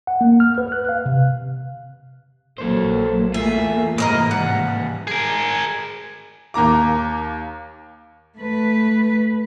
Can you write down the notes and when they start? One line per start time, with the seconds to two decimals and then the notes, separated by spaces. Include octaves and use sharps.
0.07 F#5
0.21 A#3
0.40 F6
0.58 B4
0.72 F#6
0.89 F5
1.06 C3
2.58 A#1 F#3 A#3 A4 C5
3.34 E2 A3 A#3 F4 G#4 E5
3.98 G#2 C3 E3 A#3 A#4 B4 D#5 D#6
4.31 D#2 G3 F#5
5.07 G#4 A#4
6.54 D#2 A#3 A#5 D6
8.38 A3 B4